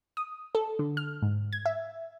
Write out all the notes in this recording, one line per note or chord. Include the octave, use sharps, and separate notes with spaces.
D#6
A4
D3
F6
G#2
G#6
E5